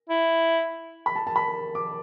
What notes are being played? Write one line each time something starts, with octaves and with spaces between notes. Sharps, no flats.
E4
B5
A5
A5
B5
D6